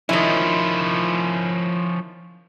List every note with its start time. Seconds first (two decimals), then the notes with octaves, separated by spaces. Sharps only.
0.09 D#3 F3 C#4 E4